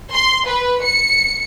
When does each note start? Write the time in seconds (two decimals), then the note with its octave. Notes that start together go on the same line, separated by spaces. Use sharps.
0.13 C6
0.48 B4
0.83 C#7